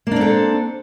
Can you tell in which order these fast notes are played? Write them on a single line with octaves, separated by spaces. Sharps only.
A#3 D4 C4 A4